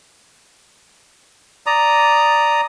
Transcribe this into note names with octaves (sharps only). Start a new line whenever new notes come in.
D5 A#5 D#6